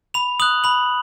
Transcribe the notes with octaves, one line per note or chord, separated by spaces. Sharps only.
B5 F7
D#6 F#6 F#7
B5 F#7